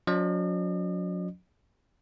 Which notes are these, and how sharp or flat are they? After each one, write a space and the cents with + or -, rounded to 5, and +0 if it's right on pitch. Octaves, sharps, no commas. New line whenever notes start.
F#3 -40 C#4 +30 D#5 -45